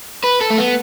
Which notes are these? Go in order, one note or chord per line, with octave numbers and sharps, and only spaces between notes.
B4
A4
A3
B3